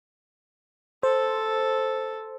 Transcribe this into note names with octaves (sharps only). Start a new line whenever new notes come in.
A4 C5